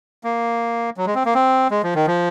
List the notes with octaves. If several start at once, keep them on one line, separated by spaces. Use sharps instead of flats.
A#3
F#3
G#3
C4
A#3
C4
G#3
F3
D#3
F3